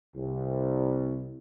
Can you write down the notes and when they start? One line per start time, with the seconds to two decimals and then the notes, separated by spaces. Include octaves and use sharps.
0.15 C2